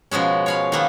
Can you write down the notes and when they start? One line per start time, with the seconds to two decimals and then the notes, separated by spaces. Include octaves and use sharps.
0.11 B2 F3 G#3 C#4
0.46 C#5 F5 B5
0.72 D#3 A#3 B3